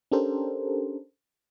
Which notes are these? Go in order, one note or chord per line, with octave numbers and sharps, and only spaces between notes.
C#4 D4 G4 A4 A#4 C5